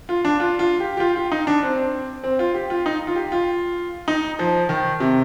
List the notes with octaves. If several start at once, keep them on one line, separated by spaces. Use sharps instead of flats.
F4
D4
F4
F4
G4
G4
F4
F4
D#4
D4
C4
C4
F4
G4
F4
D#4
F4
G4
F4
D#4
F3
D#3
C3